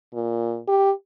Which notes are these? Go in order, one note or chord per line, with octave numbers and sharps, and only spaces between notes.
A#2
G4